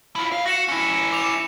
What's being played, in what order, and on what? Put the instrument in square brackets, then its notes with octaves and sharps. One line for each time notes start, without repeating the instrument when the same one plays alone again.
[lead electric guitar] E4 F4
D2 F5
[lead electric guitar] F#4 [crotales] A#6 C#7 E7
[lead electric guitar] C#4 E4
[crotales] D6 F7